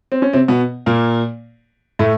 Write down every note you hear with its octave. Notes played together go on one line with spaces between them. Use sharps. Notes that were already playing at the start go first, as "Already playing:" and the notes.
C4
C#4
C3 C4
B2 B3
A#2 A#3
A2 A3